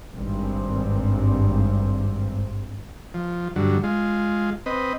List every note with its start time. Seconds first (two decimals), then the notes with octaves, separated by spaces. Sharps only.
0.14 G#1 G2 C4
3.14 F3
3.56 G2 D3 F#3
3.84 G#3 F4
4.66 C4 B4 D#5